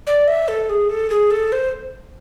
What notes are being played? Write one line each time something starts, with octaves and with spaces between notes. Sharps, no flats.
D5
E5
A4
G#4
A4
G#4
A4
C5